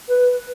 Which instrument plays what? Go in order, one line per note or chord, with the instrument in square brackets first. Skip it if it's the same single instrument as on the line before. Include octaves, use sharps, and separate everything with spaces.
[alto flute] B4